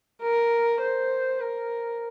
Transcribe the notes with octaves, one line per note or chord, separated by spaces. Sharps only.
A#4
C5
A#4